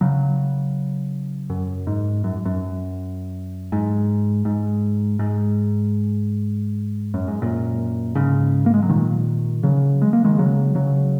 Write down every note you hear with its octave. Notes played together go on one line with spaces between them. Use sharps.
C#3 F#3
F#2
G#2
F#2
F#2
G#2
G#2
G#2
F#2
G#2
F#2 A#2
G#2 C#3
A#3
G#3
F#3
A#2 D#3
C#3 F#3
G#3
A#3
D#3 G#3
C#3 F#3
C#3 F#3